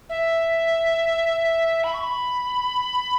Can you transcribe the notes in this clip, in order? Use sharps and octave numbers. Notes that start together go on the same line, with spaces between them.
E5
B5
C#6
B5